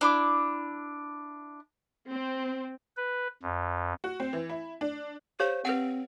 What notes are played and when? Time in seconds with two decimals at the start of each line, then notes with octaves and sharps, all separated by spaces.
0.01 D4 E4 D6
2.11 C4
2.97 B4
3.42 F2
4.04 F#4
4.20 C4
4.33 E3
4.49 E4
4.81 D4
5.40 G4 C5 C#5 F5
5.65 C4 B4 F#5